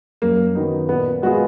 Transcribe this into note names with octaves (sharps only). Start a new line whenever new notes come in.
F#2 A#3
D#3 F#3 B3 D#4
A#2 B3
G#3 B3 F4 F#4 G#4